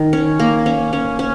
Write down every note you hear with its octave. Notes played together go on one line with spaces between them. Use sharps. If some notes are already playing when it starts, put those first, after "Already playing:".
Already playing: D#3
C#4
A#3
C#4
C#4
C#4